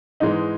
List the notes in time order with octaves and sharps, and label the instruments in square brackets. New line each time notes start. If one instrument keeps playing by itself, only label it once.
[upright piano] G#2 E3 G#3 D#4